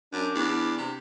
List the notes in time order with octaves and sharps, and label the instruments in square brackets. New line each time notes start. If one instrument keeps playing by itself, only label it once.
[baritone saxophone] F#2 [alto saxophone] D4
[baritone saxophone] E2
C3